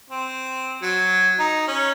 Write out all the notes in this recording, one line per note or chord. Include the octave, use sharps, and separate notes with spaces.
C4
F#3
D#4
C#4